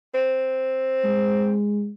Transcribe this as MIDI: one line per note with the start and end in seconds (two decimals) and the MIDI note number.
0.14 1.55 60
1.04 1.91 56